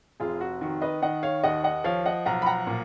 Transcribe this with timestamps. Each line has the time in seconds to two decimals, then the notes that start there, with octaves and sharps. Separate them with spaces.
0.20 F1 F4 G#4
0.41 F#4
0.61 D#3 F#4
0.82 B4 D#5
1.02 D#3 D#5 F#5
1.23 C#5 F5
1.44 D#2 D#5 F#5
1.64 D#5 F#5
1.84 F3 C#5 F5
2.06 D#5 F#5
2.26 B1 F#5 A#5
2.42 B5
2.46 F#5 A#5
2.67 A#2